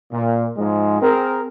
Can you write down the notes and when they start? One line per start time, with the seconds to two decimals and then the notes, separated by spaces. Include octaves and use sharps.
0.11 A#2
0.57 G#2 F3 G#3
1.01 C4 G#4 A#4